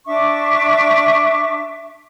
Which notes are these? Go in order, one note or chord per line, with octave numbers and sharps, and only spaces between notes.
D4 E5 C#6 D6